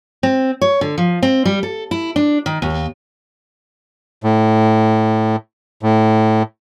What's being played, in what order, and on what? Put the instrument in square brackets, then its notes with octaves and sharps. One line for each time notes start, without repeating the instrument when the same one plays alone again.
[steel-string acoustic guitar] C4
C#5
D3
F3
C4
G3
A4
E4
D4
D#3
D#2
[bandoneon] A2
A2